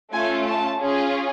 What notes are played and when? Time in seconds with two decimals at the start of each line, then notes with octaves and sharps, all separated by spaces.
0.13 A3 C#4 F4 G#5
0.46 A5
0.79 C#4 F4 G#4